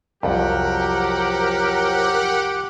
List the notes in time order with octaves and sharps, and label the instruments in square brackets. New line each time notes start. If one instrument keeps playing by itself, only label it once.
[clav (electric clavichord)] C2 F2 [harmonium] F3 F#3 [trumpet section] G4 F#5 [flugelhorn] A#4